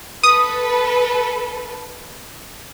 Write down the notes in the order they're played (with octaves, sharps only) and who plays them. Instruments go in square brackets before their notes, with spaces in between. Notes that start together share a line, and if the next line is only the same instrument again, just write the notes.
[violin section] A4 B4 [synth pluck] D#6